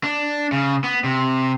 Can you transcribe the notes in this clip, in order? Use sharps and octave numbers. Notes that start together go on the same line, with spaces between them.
D4
C#3
B3
C3